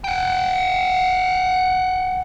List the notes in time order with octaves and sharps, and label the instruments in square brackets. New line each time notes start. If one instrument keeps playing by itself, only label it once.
[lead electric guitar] F#5 G5